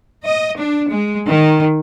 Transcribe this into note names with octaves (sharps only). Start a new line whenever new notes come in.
D#5
D4
G#3
D#3